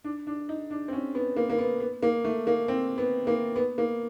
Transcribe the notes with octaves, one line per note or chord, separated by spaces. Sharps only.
D4
D4
D#4
D4
C4
C#4
B3
A#3
A#3
B3
B3
A#3
A3
A#3
C4
B3
A#3
B3
A#3